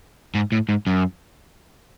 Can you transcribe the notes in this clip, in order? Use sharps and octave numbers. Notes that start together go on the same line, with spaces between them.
G#2
A2
G#2
F#2